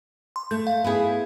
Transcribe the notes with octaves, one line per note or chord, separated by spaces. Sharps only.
C6
A3 G6
F5
B3 E4 G#4